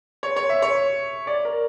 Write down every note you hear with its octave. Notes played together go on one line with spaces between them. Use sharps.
C#5
C#5
E5
C#5
D5
A#4